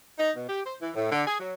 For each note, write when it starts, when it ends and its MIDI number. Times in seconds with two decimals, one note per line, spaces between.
0.18 0.30 63
0.36 0.47 47
0.49 0.61 67
0.65 0.75 72
0.81 0.90 52
0.96 1.09 45
1.12 1.23 50
1.27 1.37 68
1.40 1.54 54